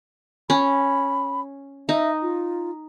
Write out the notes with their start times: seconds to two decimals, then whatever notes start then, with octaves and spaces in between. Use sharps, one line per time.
0.50 C#4 B5
1.89 D#4 E5
2.22 F4